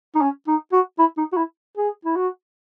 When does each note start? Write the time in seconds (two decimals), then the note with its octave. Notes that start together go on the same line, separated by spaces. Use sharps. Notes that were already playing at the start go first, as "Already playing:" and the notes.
0.15 D#4
0.21 C#4
0.47 D#4
0.72 F#4
0.99 E4
1.18 D#4
1.33 F#4
1.37 E4
1.77 G#4
2.05 E4
2.16 F#4